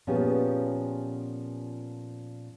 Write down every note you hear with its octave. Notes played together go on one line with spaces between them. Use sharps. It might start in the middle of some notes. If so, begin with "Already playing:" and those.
A#2 F3 B3 C#4 G4 G#4